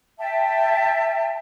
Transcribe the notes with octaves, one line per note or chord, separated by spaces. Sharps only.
E5 G5 A5